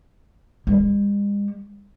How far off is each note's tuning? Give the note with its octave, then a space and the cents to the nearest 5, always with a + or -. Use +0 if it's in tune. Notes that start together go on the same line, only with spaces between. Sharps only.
G#3 -45